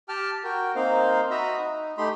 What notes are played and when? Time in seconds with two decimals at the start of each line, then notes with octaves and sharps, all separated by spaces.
0.09 G4 G5 A5 F6
0.44 F#4 A#4 G5
0.75 A#3 C4 D#4 C5 F5
1.30 F#4 D#5 E5 A#5 B5
1.58 D#4
1.98 A3 D#4 G4 B5 C6